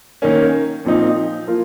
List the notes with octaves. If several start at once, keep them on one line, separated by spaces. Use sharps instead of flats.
D#3 A#3 C#4
A#2 F3 C4 D#4
F3 A#3 F4